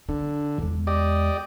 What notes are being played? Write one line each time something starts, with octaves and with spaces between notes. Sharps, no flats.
D3 D4
E2 G#3
G4 D5 D#5